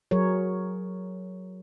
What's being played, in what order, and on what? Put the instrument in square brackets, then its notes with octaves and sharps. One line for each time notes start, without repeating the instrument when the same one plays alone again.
[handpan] F#3 G#4 A#4 C#5